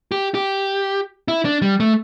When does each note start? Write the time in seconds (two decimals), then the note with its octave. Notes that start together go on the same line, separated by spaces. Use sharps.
0.12 G4
0.35 G4
1.28 E4
1.45 D4
1.62 G3
1.80 A3